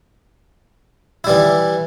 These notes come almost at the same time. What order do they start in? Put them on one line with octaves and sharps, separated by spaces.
E4 G3 E3